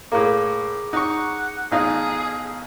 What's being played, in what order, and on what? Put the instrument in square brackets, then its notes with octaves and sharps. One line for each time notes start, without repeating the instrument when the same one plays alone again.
[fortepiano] A2 A#3 [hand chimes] G#4 A#5 D6
[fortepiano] D#4 C#6 [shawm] F#5
[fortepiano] A1 D#4 F4 [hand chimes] B3 D#5 [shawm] G#4